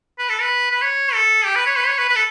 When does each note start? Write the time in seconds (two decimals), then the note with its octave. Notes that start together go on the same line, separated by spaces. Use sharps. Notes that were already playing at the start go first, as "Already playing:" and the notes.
0.19 B4
0.29 A4
0.41 B4
0.71 B4
0.82 C#5
1.14 A4
1.46 G4
1.56 B4
1.66 C#5
1.77 B4
1.87 C#5
1.99 B4
2.09 B4
2.16 A4